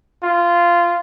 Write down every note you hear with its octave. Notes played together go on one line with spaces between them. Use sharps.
F4